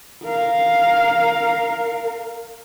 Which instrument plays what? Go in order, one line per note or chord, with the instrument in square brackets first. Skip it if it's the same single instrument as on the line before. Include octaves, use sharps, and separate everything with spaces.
[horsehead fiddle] A#4 F5